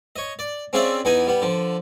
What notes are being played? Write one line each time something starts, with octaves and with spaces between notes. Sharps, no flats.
C#5 D#5
D5
C4 C#4 F4 G#4 D5 E5
E2 B3 D#4 G#5 D#6
G3 B3
D3 F3